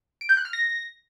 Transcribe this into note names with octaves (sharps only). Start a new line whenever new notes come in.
D7
G6
F#6
F6
A#6